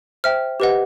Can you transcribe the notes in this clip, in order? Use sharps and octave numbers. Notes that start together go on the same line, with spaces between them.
C5 E5 G5 F6
G4 B4 D#5 F#5